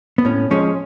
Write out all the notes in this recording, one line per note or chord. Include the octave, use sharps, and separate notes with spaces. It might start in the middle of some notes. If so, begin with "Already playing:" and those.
B3
A2 C#4
F3 G#3 C#4